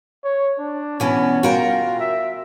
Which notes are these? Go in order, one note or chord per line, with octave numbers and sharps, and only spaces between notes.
C#5
D4
B2 E3 B3 C#4
F4 F#4 A#4 G5
E5